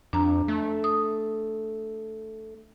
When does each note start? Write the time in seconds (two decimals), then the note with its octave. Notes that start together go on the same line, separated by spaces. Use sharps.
0.13 F2 D4 A#5
0.48 A3
0.84 D#6